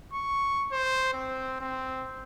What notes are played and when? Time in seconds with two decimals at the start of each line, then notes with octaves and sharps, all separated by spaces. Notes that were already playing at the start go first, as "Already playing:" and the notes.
0.13 C#6
0.72 C5
1.14 C4
1.61 C4